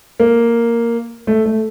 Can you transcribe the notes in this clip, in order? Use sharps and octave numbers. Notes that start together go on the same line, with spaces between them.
A#3
A3
A3